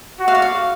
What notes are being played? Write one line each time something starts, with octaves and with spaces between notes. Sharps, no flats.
F#4
F5
D5
F5